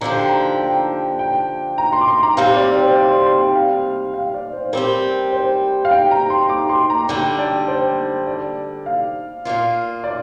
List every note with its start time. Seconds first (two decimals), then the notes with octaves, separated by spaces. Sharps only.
0.01 D3 F3 D4 G4 A#5
0.15 G5
0.29 A#5
0.60 G5
1.19 G5
1.78 A#5
1.93 C6
2.01 D6
2.08 C6
2.23 A#5
2.37 C3 G3 C4 F5
2.56 D5
2.77 C5
2.96 D5
3.10 C6
3.25 C6
3.41 G5
3.55 F5
4.14 F5
4.34 D5
4.53 C5
4.73 G3 C4 G4 A#4
5.33 C5
5.85 F5
5.91 G5
6.11 A#5
6.30 C6
6.49 D6
6.69 C6
6.90 A#5
7.09 D3 G3 D4 G5
7.39 D5
7.68 C5
8.27 D5
8.86 F5
9.45 A#2 A#3 F4
10.04 D5